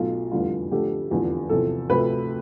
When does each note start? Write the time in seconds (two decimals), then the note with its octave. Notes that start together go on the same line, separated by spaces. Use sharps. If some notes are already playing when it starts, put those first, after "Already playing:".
Already playing: B1 B2 A3 F4
0.32 F1 E2 D3 G3 F4
0.71 F2 D3 F3 A3 G4
1.11 F1 E2 D3 F3
1.49 E2 C3 F3 A4
1.89 D2 C3 F3 A3 B4